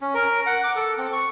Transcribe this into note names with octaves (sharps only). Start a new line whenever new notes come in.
C#4
A#4
F#5
D6
A4
C4
C#6